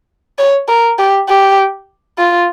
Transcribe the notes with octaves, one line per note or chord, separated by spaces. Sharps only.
C#5
A#4
G4
G4
F4